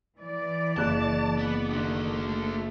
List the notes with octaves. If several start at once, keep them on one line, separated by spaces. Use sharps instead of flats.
E3 D5
F#1 A5 F#6
B3
D3 D#3 A3 D4 F#4
A3